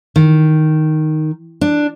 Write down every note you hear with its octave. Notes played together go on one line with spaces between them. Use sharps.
D#3
D4